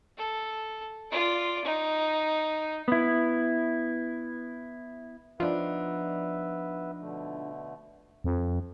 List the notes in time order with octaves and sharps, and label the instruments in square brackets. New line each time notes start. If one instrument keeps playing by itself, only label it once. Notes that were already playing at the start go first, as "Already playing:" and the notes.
[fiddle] A4
F4 D5
D#4
[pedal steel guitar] B3 E4
[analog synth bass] F3 [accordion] B3 B4 E5 [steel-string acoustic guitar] D4 D#4
[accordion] B2 D3 A3
[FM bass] F2